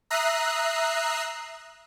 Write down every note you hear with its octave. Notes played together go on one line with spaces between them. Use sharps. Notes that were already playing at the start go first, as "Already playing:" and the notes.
E5 A#5 D#6 F#6 C7